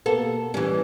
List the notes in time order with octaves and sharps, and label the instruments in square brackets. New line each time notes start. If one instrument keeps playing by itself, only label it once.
[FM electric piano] B2 A#3 B3 [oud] A4
[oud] E3 C#4 [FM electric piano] G3